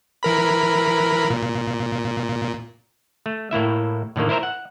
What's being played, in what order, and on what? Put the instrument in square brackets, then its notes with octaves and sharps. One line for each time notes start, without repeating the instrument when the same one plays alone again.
[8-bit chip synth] E3 A#4 B5
A#2
[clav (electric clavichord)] A3
A2 A#3 E4 E5
A2 D3 D#3 A#3
E4 A#4 C5 E5 A#5
F#5